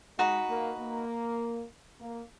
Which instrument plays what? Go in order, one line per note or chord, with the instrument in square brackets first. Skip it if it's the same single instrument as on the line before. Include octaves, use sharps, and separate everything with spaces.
[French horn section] G#3 [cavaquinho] D#4 F#4 B4
[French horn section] A#3
A#3
A#3